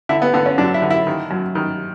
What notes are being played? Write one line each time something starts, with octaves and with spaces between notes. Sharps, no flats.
D3 E4
B3
D3 B3
C#4
F#2 D4
E4
D3
E4
D#3
F#2
D#3